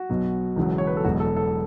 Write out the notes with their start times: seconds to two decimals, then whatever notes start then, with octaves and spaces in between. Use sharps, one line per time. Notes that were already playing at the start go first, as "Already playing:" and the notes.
Already playing: F#4
0.09 B1 B2 F#3
0.56 E1 E2 C#3 F#3
0.78 C#5
0.87 B4
0.97 A4
1.04 E1 E2 B2 F#3 F#4
1.20 A4
1.36 A4